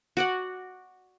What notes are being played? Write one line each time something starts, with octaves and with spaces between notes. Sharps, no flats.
F#4 D5 F#5